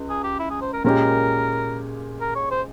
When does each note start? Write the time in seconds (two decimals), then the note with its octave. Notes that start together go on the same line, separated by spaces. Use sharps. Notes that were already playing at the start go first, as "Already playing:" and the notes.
Already playing: C#2
0.09 G#4
0.23 G4
0.39 E4
0.50 G#4
0.61 C5
0.73 A#4
0.84 A#2 G#3 C#4 G4 A#4
2.20 A#4
2.35 C#5
2.51 C5